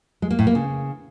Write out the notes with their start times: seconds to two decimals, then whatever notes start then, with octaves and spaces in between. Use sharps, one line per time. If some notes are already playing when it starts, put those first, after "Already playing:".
0.22 G#3
0.31 A#3
0.39 A2
0.47 A#3
0.55 C#3